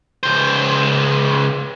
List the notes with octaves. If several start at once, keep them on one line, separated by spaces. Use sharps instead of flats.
C#2 C5